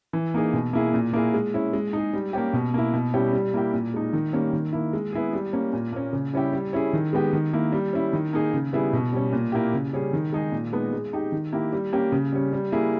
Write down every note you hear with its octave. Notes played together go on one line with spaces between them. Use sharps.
E3
A#3 D#4 G#4
B2
A#3 E4 G#4
A#2
A#3 E4 G#4
G#3
C#4 E4
G#3
D#4 G#4
G3
A#3 C#4 G4
B2
A#3 E4
B2
G3 C#4 E4 G4
G3
A#3 E4 G4
A#2
G#3 D#4
D#3
G3 A#3 C#4
D#3
A#3 E4
G#3
B3 E4 G#4
G3
A#3 C#4
A#2
A#3 C#4
C#3
G3 C#4 E4 G4
G3
C#4 E4 G#4
D#3
G#3 B3 G4
D#3
A#3 E4
G3
C#4 E4
D#3
A#3 D#4 G#4
C#3
G3 B3 E4 G#4
B2
G3 C#4
A#2
A#3 E4 G4
C#3
G3 C#4 G#4
D#3
G#3 D#4 G#4
A#2
G#3 B3 D#4
G#3
D#4 G4
D#3
A#3 E4 G4
G3
A#3 C#4 G4
C#3
G3 C#4
G3
A#3 E4 G#4